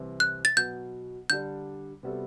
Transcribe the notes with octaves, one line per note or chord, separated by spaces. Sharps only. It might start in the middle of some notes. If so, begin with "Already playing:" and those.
Already playing: C2 C3 E3
F#6
A6
B2 F#3 B3 G6
D3 G3 D4 G6
C3 G3 B3 F#4 A4